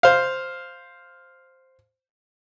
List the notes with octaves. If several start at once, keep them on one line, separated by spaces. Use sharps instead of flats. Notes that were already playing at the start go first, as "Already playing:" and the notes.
C5 F5